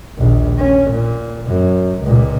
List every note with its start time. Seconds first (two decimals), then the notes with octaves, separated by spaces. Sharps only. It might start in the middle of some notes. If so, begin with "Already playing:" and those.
0.18 A#1 D#2
0.59 C#4
0.91 A#2
1.49 F#2
2.02 C#2 A#2